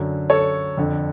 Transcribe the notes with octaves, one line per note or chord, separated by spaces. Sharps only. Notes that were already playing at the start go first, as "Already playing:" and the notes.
Already playing: F#2 D3
A4 C#5
F2 D3